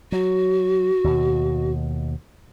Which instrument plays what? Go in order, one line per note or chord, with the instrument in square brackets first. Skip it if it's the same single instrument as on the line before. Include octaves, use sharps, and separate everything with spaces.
[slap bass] F#3 [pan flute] F#4
[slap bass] D#2 B2